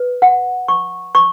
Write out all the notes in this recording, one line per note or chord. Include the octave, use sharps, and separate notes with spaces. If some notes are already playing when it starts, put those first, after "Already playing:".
Already playing: B4
F#5
C#6
C#6